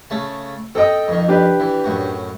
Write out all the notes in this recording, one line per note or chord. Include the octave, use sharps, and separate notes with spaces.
C#3 A3 A5
C4 A4 D#5 G5 D#6
F2 D#3
D4 G4 B4
E3
F#2 A2 F#4